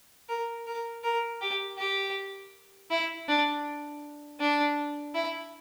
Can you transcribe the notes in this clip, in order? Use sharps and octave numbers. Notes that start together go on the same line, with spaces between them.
A#4
A#4
A#4
G4
G4
E4
D4
D4
E4